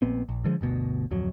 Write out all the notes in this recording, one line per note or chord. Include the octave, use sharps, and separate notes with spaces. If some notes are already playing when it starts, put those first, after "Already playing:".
A#1 A#2 B3 C4
A#1
D3 F3 G3 G#3
G1 D2 B2
D1 F2 F#3